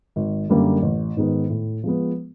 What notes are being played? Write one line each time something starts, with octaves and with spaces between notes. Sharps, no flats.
G#1
F#2 D3 G3 A#3
A1
G#2 D#3 G#3 B3
A2
F3 G#3 B3